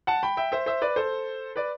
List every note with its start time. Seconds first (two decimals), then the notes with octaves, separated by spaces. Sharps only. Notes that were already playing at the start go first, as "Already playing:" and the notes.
0.07 F#5 A5
0.23 G5 B5
0.37 E5 G5
0.52 C5 E5
0.66 C5 E5
0.82 B4 D5
0.96 A4 C5
1.56 B4 D5